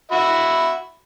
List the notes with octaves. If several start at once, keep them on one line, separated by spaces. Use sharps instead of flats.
F#4 E5 B5